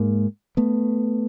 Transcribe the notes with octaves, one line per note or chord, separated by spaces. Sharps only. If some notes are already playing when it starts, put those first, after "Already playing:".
Already playing: G#2 G#3 A#3
A3 B3